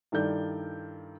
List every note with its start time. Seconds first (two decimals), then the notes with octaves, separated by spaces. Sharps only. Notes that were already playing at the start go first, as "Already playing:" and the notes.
0.12 G2 D#3 E4 A4 D5 G6